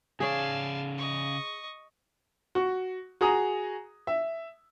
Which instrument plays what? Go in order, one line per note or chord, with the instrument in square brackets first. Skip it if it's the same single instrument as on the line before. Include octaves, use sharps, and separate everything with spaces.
[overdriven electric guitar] C#3 D5 [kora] G#4 C#5 [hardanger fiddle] F5 A5
[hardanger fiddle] D#5 C#6
[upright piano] F#4 C#6
F#4 G#4 A#5 D#6
E5